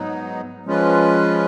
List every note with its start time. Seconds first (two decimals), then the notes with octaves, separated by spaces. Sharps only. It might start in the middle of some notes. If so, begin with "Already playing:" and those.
Already playing: G#2 F#3 B3 D#4
0.66 F3 G#3 C#4 F4 B4